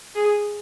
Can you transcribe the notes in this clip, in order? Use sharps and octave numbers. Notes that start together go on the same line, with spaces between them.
G#4